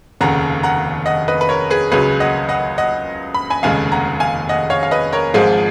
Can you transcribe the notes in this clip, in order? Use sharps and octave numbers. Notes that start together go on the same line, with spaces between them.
F1 D#2 C#3 F#5 A#5
F#5 A#5
D#5 F#5
B4 D#5
B4
A#4 C#5
G#4 B4
C#2 C#3 F#3 G#4 B4
D#5 F#5
D#5 F#5
D#5 F#5
B5
G#5 B5
F1 D#2 C#3 G#3 F5 G#5
F#5 A#5
F5 G#5
D#5 F#5
C#5 F5
F5
B4 D#5
A#4 C#5
G#1 G#2 F3 G#3 F4 G#4